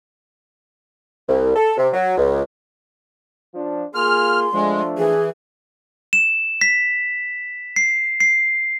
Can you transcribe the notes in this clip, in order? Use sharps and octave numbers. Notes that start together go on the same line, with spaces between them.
C2
A4
C3
F#3
C#2
F3 D4
A#3 F4 G#4 C6 F6
F3 G#3 A3 D4
E3 G#4
E7
B6
C7
C7